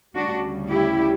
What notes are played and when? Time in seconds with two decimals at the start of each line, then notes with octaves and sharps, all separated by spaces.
0.15 D2 C#3 G3 D4 F#4
0.71 E4 G4